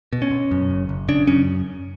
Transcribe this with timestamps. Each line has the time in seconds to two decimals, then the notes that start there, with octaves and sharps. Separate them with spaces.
0.13 B2
0.22 C#4
0.31 B2
0.51 F#2
0.70 F#1
0.89 F#1
1.09 C#3 D4
1.27 F#2 C#4